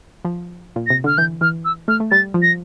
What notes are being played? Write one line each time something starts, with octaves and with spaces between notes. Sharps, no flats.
F3
A#2
C3 A#6
D3 F6
E3 G6
E3 F6
E6
A3 F6
A3
G3 A6
F3
A#6